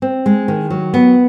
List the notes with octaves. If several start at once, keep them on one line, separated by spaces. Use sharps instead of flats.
C4
G#3
D#3
F#3
B3